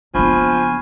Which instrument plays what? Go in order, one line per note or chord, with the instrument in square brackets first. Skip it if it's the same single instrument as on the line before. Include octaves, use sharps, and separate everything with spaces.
[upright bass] F#1 B3 [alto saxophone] F3 [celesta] D4 B5 C#6 [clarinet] G#5